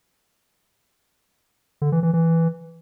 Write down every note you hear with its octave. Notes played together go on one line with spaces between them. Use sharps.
D3
E3
E3
E3